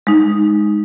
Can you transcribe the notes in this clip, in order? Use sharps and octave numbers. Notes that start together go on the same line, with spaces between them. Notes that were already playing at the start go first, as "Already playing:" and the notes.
G#3 D#4